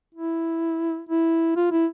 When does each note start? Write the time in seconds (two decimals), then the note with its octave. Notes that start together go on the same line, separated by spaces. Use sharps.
0.14 E4
1.09 E4
1.56 F4
1.72 E4